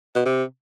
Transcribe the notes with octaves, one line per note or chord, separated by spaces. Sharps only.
B2
C3